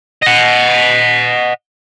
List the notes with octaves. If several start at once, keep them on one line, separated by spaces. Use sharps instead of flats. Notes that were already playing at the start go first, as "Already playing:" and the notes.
D#5 F#5